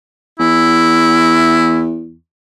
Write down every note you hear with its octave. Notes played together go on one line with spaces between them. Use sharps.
E2 E4